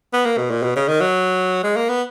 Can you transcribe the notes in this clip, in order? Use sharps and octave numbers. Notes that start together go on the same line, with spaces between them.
B3
A#3
B2
A#2
B2
C#3
D#3
F#3
G#3
A#3
B3